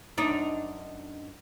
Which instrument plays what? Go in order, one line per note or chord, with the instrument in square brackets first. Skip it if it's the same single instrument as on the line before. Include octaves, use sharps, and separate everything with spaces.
[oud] F#2 D4 D#4